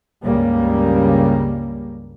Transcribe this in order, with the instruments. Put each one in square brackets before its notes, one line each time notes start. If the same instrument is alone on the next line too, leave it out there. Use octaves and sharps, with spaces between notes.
[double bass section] C#2 G2 C#3 G3 A#3